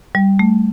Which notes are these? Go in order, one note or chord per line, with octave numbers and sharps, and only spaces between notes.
G3
A3